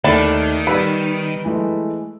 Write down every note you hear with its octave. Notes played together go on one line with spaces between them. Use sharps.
D#2 D#3 A3 D4 E4 A4
G3 B3 B4 E6 D#7
E3 G#3 A3